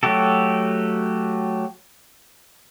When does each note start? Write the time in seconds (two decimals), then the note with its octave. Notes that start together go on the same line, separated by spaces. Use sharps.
0.03 F#3 A3 F#4 G4 A4